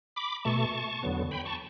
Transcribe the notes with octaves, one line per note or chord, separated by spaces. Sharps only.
B5 D6
B2 A3 A5 C#6
E2 D3 F#3 B3
G5 B5
A5 C#6